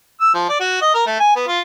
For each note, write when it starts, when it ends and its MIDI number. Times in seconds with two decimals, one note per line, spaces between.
0.20 0.30 88
0.34 0.45 53
0.49 0.60 74
0.60 0.82 66
0.82 0.91 75
0.94 1.03 70
1.07 1.19 57
1.19 1.33 80
1.36 1.45 59
1.48 1.60 65